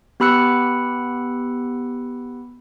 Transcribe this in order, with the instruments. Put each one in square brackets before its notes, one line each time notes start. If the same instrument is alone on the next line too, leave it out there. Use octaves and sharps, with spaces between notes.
[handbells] B3 G4 B5 E6 F#6 C#7